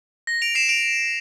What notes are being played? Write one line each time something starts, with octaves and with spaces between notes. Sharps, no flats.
A#6
D7 F7
C7 E7
D7 F7